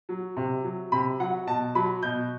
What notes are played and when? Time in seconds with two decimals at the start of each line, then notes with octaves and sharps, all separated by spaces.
0.09 F#3
0.37 C3
0.64 F#3
0.92 C3 B5
1.20 F#3 F#5
1.47 B2 A5
1.75 F#3 B5
2.03 B2 G6